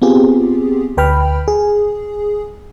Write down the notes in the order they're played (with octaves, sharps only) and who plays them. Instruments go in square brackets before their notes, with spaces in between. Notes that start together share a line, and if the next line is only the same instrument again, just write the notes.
[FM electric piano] B3 C4 F4 G4 G#4
D2 B4 G5 B5 F6
G#4